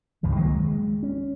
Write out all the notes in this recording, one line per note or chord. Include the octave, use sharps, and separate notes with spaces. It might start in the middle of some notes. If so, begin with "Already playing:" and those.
C#2 G2 D#3 F3
D#3 F#3 G#3 A#3
G#3
C#4